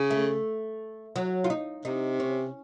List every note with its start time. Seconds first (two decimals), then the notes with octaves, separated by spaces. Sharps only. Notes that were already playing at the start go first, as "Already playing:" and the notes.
Already playing: C#3
0.11 A3
1.16 F#3
1.44 F4
1.50 D#4
1.85 C3 D#4
2.20 C#4